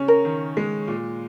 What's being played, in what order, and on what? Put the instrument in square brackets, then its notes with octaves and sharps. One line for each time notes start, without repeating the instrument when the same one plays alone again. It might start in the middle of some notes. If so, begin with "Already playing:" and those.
Already playing: [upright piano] C#3 C#4
[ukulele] A#4
[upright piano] D#3
G#3
A#2